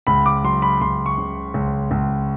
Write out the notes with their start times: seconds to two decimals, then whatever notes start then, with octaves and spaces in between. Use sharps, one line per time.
0.07 C#2 B5
0.26 D6
0.44 F#3 C6
0.62 B5
0.81 C#2 C6
1.06 C#6
1.18 C#3
1.54 C#2
1.91 C#2